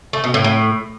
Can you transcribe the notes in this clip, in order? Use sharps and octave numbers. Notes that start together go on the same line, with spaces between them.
A3
B2
A2
A2